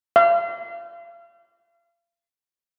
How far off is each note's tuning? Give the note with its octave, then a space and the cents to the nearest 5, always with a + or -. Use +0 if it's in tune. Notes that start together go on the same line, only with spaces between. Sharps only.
F5 -35